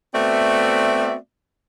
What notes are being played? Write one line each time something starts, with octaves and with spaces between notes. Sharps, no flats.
A3 B3 C4 F#4 D5 E5